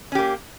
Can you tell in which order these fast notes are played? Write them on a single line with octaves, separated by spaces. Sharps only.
C#4 G4 A#3